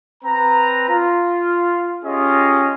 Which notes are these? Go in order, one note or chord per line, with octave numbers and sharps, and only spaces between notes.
C4 B4 A#5
F4
C#4 F4 G4 G#4 D#5